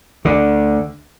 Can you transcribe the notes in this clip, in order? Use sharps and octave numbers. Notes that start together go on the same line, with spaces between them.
D2 D3